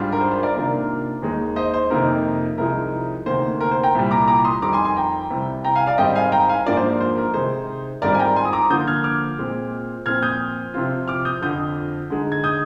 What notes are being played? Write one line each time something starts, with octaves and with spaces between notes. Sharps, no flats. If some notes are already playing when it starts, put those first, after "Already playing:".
Already playing: G#2 G3 D4 F4
A#4
C5
C5
A#4 D5
C3 D#3 A#3 D4 F4 A#4
A#4
D#2 D#3 G#3 D#4
C5 D#5
C5
F2 C3 D#3 A#3 D#4 A#4
C2 C3 F3 G#3 D#4 A#4
D2 C3 D#3 A#3 C5
A#4
C5
G5 A#5
C2 A#2 G3
A#5 D6
A#5 D6
C6 D#6
F2 D#3 G3 A#5 D6
G#5 C6
G#5 C6
G5 A#5
C2 C3 G3
G5 A#5
F5 G#5
D5 F5
G#2 D#3 G3 C4 D#5 G5
F5 G#5
G5 A#5
F5 G#5
G#2 F3 A#3 D4 F4 A#4 D5
C5
A#4
C5
A#4
C3 D#3 G#3 D#4 C5
G#2 D#3 G3 C4 F4 A#4 D5
G#5
G5 A#5
G#5 C6
D#6
A#5 D6
D3 F3 A#3 F4 D#6 G6
F6 G#6
D6 F6
A#2 G#3 C4
A#2 F3 C4 F6 G#6
D#6 G6
C3 F3 C4 F4
D6 F6
D#6 G6
F2 D3 F3 D#6 G6
D3 G#3 D#4
G#6
D#6 G6